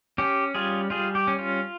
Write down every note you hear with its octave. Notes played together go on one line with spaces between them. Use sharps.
C#4 G4
G3 F4 G#4
G3 F4 G#4
G4
C#4
F4